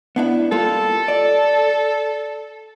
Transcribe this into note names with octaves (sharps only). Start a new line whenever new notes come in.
B3 D4 E4
G3 A#3 F4 A4
D5